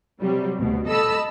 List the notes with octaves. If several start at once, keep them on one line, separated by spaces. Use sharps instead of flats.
C3 F#3 G3
D2 B2
A4 D#5 A5 B5 E6